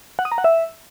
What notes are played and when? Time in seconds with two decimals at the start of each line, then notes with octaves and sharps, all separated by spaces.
0.19 F#5
0.25 D#6
0.32 A#5
0.38 F#5
0.44 E5